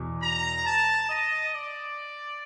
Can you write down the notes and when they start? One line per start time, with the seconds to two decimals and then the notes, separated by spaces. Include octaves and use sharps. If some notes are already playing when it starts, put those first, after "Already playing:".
Already playing: E2 B2
0.23 A#5
0.66 A5
1.10 D#5
1.55 D5